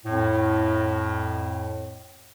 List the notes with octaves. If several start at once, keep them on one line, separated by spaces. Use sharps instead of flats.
F2 A2